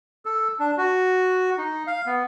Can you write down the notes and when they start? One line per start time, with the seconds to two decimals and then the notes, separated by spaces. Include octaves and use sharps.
0.25 A4
0.59 D4
0.77 F#4
1.58 D#4
1.87 F5
2.06 B3